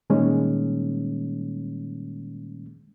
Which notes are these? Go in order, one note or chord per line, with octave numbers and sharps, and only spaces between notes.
A#2 D#3 G3 G#3 A#3 C#4